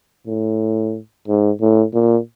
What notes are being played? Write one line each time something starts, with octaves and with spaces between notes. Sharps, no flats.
A2
G#2
A2
A#2